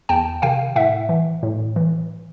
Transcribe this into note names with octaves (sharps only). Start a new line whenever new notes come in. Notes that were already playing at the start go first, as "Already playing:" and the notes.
E2 G5 A5
C3 D#3 F5 G5
A2 E5 F#5
E3
A2
E3